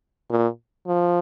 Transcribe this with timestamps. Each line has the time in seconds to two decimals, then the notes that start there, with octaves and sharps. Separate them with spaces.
0.30 A#2
0.87 F3